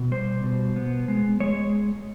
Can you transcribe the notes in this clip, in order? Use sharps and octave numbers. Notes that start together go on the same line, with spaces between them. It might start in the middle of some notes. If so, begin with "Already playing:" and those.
Already playing: B2
G3 C5
B2
B3
G#3
G#3 C#5